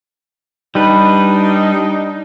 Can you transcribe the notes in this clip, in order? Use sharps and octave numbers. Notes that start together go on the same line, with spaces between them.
G3 D4 D#4 B4